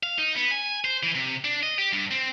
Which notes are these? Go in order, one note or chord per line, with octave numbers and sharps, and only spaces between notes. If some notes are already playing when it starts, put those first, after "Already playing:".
F5
D#4
B3
G#5
C5
E3
C3
D4
D#5
G4
G2
C4